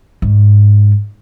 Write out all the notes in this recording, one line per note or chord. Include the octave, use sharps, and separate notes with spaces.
G#2